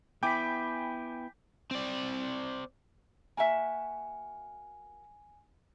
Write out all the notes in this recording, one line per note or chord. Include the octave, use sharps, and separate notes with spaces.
B3 E4 G5 G#5 B5 D6 G6 B6
C4 D5
A#3 F#4 E5 G#5